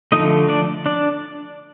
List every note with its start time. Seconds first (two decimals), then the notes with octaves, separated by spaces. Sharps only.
0.12 D3 F3 A3 D#4 D#5
0.49 D4 D5
0.86 D4 D5